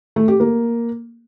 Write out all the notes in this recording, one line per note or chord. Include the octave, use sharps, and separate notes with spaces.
A3
G4
A#3